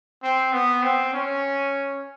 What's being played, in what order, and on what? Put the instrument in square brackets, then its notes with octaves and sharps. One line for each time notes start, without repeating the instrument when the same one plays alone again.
[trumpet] C4
B3
C4
C#4